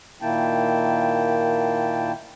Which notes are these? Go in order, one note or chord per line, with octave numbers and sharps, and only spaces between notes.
A#2 D#3 A#3 E4 G5 A5